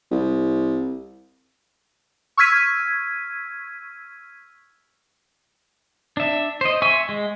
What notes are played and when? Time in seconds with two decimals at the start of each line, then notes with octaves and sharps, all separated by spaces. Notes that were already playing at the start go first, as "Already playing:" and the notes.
0.11 C2
2.37 C#6 E6 F6 G#6 B6 D#7
6.17 D4 E5
6.61 C5 D#5
6.82 E5 G#5 C6 C#6 E6
7.09 G#3